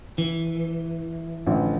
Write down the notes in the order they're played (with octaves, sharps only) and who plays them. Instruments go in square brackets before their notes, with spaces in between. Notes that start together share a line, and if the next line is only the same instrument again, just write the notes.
[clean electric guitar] E3
[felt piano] A1 D3 F3